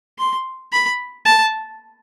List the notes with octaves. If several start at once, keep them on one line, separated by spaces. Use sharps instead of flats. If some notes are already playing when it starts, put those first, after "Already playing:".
C6
B5
A5